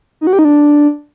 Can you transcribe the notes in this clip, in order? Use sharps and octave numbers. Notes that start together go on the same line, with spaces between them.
D#4
F#4
G4
D#4
D4